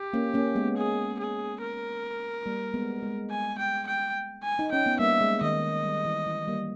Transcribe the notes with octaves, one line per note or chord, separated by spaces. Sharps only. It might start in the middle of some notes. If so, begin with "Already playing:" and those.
Already playing: G4
A#3 C#4
A#3 C#4
G#3 B3
G#4
G#4
A#4
G3 A#3
G#3 B3
G#3
G#5
G5
G5
G#5
D#4
C#4 G5
B3
G3 A#3 E5
G#3
D#3 D#5
G3
E3
E3
G3 A#3